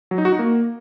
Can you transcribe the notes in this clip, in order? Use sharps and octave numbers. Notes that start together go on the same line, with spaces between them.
F#3
D#4
F#4
D#4
A#3